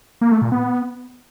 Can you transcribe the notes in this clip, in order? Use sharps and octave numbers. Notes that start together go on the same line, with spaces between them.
A#3
A3
A#2
B3